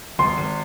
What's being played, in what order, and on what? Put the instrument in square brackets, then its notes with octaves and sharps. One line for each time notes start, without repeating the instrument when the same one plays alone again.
[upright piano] G#1 [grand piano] C6
[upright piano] G#1